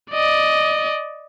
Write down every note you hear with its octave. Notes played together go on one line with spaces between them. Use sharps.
D5 D#5